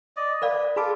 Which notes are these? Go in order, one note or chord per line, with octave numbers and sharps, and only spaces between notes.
D5 D#5
A#4 B4 D5 F5
F4 G#4 A4 B5 D6